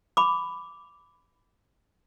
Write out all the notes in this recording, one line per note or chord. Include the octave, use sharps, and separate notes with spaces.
B5 D6